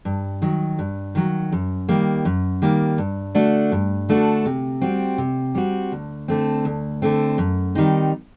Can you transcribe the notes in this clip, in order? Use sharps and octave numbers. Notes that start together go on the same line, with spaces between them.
G2
D#3 F#3
G2
D#3 F#3
F#2
D#3 G3 A#3
F#2
D#3 G3 A#3
G2
D3 A3 D4 F#4
G2
D3 A3 D4 F#4
C3
G3 C4 F#4
C3
G3 C4 F#4
D2
D3 A3 C4
D2
D3 A3 C4
F#2
D#3 G3 C4 D#4